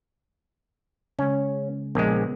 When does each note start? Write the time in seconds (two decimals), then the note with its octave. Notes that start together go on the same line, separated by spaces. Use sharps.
1.19 C#3 G#3 C#4
1.95 A#1 G#3 B3